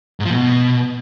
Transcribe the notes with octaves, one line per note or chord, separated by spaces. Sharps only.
G#2
F3
A#2
B2